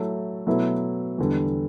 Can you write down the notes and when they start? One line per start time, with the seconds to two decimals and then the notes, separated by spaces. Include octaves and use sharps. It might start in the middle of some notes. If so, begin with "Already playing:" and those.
Already playing: F#3 A3 E4 A4
0.47 B2 F#3 A3 E4 B4
1.18 E2 D3 G3